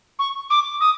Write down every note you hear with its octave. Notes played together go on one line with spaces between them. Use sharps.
C#6
D6
D#6